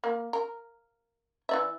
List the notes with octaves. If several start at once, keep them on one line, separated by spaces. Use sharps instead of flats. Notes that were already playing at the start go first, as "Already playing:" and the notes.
A#3
A#4
E3 D5 E5